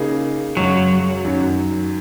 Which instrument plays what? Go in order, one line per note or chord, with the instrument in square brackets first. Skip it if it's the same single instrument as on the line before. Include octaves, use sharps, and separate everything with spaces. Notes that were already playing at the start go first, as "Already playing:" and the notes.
Already playing: [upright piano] C#3 A#3 D#4 G#4
[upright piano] F#2 C#3 G#3 F#4 [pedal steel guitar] F#3
[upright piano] F#2 D#3 F#3